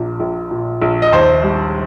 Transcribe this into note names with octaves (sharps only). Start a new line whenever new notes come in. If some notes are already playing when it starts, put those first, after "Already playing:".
Already playing: A#1 A#2
A#1
A#2
A#1
D#5
D#2 C5
G3